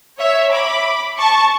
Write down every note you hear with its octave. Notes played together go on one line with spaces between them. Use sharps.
C#5 E5
B5 D6
A5 C#6